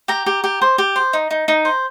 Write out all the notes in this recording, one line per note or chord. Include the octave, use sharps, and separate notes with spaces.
G4 A#5
G4
G4
C5
G4
C5
D#4
D#4
D#4
C5